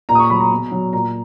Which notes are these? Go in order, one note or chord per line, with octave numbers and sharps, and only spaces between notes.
A#2 A#5
D#6
C#6
F#3 B5
A#5
B2
F#3
A#2 A#5